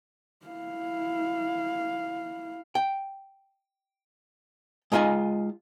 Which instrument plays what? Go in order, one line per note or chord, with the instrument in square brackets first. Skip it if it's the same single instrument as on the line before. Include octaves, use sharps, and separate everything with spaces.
[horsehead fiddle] E4 F5
[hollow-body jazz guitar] G5
G#3 D#4 F4 D#5 G#5